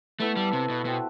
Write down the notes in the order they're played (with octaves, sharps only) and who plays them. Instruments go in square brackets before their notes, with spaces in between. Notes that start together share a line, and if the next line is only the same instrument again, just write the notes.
[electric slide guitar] A3 [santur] B3 E4 A4 E5
[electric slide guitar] G3
C3
B2
[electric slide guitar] B2 [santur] A3 C4 F#4